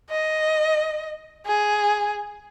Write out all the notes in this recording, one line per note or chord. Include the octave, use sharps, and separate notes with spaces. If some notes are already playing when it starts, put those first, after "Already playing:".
D#5
G#4